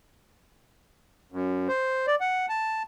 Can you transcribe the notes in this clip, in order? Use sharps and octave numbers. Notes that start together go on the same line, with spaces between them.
F#2
C5
D5
F#5
A5